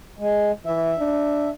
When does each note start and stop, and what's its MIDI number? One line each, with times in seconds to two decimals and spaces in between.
0.19 0.52 56
0.66 0.93 52
0.66 1.50 76
0.98 1.51 62